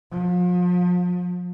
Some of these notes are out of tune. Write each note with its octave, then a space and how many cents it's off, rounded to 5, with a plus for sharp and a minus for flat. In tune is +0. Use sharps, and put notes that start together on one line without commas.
F3 +35